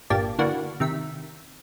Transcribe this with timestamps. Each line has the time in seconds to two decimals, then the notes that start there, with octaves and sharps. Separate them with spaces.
0.10 G1 A#2 A#3 G4 D5 A5
0.39 D3 E3 A#3 D4 F#4
0.80 C3 D#3 E5 B6